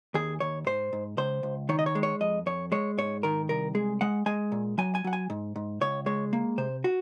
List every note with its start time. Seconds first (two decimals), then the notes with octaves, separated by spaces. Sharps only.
0.14 D#2 G#4
0.40 D#2 C#5
0.66 G#2 C5
0.93 G#2
1.17 C#2 C5
1.43 C#2
1.69 D#3 C#5
1.79 D#5
1.86 C#5
1.95 G#3
2.03 C#5
2.21 F2 D#5
2.46 F2 C#5
2.72 G#3 C#5
2.98 G#2 C#5
3.23 D#3 A#4
3.49 C2 A#4
3.75 G#3 G#4
4.01 G#3 F#5
4.26 G#3 G#5
4.52 A#2
4.78 F#3 G#5
4.95 G#5
5.04 F#3 F#5
5.13 G#5
5.30 G#2
5.56 G#2
5.81 C#2 C#5
6.06 G#3 C#5
6.33 A#3
6.58 C3 C5
6.84 F#4